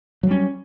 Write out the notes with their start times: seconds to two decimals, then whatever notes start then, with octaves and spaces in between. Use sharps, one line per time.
0.23 F#3
0.27 G3
0.31 C#4